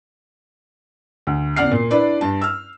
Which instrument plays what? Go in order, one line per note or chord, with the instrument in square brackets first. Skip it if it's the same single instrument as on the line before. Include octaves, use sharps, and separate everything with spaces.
[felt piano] D2
E2 C#3 D5 F#5 F6 C7
A#2
D4 E4 B4 D5
G2 A5
E6 F6